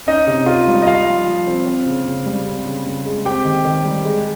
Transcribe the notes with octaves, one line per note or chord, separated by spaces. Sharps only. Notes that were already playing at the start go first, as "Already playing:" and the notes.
C#4 D#4 D#5
C3
F4
G3
D#5
F4 F5
F3
F3
C4
C4
C#3
C#3
G3
C4
C#3
C#3
G#3
C4 G4 G5
D#3
D#3
G3
G#3